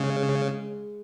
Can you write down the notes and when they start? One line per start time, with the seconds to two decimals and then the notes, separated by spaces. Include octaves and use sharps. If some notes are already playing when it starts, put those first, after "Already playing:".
Already playing: C#3 G#3